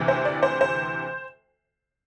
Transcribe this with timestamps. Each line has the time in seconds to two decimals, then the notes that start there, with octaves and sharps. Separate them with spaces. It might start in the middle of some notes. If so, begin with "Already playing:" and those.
Already playing: D2 C3 E3
0.08 C5
0.25 D5
0.43 C5
0.61 C5